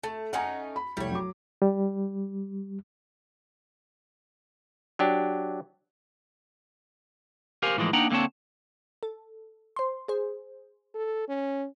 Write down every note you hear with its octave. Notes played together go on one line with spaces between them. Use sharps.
A3 A5
A3 C#4 D#4 F#5 G#5 A#5
B5
F1 C2 G3 C#5
F#3 D6
G3
F#3 D4 G4
G4 A#4 C5 F5 G#5
A2 E3 F3 G#3 A#3
A#3 D4 D#4 F#5 G5 A#5
D3 A#3 C4 C#5 A5
A4
C5 C6
G#4 C5
A4
C#4